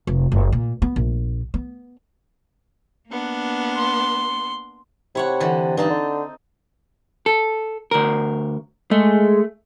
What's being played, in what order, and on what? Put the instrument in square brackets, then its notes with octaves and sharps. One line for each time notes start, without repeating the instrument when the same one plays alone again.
[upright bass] F1
F#1
A#2
B3
A#1
B3
[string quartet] A#3 B3 D4
[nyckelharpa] C6
[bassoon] C3 [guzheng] E4 C#5 F#5
[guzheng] D3 E3
[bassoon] G2 [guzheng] C4 D#4 A5
[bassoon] D3
[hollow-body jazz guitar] A4
D2 A#4
[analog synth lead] G#3 [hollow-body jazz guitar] A3